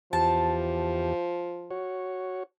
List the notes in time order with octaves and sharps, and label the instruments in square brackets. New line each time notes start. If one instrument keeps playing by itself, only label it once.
[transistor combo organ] E2 G4 [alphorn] F3 [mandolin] A5
[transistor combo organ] F#4 C#5